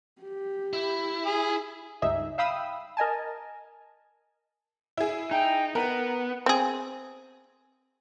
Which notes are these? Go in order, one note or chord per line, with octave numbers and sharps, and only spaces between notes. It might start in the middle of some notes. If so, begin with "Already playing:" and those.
G4
E4
G#4
C#2 G2 D#4 G#4 E5
E5 F5 G5 B5 D#6 E6
A#4 D#5 G#5 A5
E4 G#4
D#4 G5
B3 A#4 F#5
C4 G#4